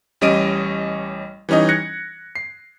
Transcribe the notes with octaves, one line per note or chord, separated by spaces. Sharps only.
A1 G3 C#4 D#5 D7 D#7
E3 G3 C#4 D#4 D#5
F#6 G#6 A#6 C#7
C7